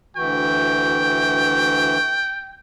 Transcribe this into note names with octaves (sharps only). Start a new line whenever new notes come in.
D2 E3 F#4 G5